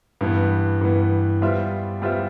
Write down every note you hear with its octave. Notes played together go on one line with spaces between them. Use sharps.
G2 E3 B3
G2 E3 B3
G3 B3 F4 C5 E5
G3 B3 F4 C5 E5